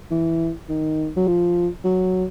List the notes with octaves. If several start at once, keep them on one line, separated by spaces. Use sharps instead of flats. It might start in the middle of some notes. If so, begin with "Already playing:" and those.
E3
D#3
F#3
F3
F#3